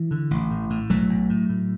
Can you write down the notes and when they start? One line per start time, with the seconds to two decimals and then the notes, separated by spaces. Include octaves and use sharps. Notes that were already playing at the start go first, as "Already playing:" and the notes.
Already playing: E3
0.11 D3
0.31 A1
0.50 A2
0.70 A2
0.90 B1 F#3 A3
1.10 B1
1.30 A2
1.49 A2